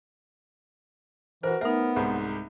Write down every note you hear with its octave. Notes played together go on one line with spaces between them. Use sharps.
E3 F#4 A#4 C5
A3 B3 D#4 A#4 E5
C2 G#2